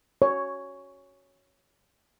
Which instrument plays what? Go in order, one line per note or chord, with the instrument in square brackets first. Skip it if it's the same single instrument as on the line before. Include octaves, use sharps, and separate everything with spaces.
[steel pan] C#5